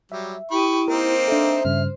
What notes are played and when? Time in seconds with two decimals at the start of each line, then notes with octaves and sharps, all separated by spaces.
0.12 F#3 G3 E5
0.51 E4 G4 B5 C#6 D#6
0.88 A#3 C4 D#4 A#4 C5
1.28 D4 A4 E5
1.65 G2 C#3 F6